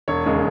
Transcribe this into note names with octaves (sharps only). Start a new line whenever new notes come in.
E1 C#5
D#2 C#3 G#3